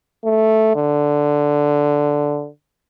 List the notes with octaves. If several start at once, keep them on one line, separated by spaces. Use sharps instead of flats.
A3
D3